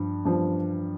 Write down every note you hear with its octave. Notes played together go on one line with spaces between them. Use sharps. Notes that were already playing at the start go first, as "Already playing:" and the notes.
Already playing: G2 F3
G2 F3